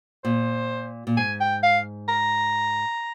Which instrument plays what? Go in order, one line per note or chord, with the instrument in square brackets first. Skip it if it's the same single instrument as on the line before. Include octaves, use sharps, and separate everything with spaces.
[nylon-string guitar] A#2 [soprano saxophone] C5
[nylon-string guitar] A#2
[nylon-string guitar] G#2 [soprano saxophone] G#5
[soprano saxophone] G5
F5
A#5